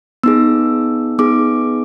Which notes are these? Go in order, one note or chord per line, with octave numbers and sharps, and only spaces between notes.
B3 D#4 G#4 E6
B3 D#4 G#4 D6